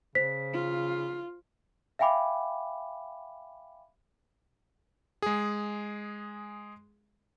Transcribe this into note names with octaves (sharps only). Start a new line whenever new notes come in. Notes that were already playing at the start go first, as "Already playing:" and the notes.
C#3 C5 B6
F4
E5 F5 G5 G#5 B5 D6
G#3 G#4